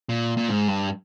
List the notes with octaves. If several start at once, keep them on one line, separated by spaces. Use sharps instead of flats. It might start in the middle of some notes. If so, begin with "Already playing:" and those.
A#2
A#2
G#2
G2